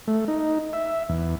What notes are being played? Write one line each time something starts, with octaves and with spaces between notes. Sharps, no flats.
A3
D#4
E5
E2